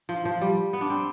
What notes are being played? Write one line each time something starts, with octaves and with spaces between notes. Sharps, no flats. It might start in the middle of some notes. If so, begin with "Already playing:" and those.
F3
F3
G3
B3
D4
C4